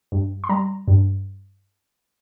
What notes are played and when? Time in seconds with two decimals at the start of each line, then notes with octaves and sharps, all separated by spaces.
0.12 G2
0.44 C6
0.49 G3 A#5
0.88 G2